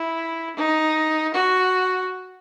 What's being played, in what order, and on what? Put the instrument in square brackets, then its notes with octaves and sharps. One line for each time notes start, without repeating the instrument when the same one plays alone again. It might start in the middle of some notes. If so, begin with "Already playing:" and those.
Already playing: [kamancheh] E4
D#4
F#4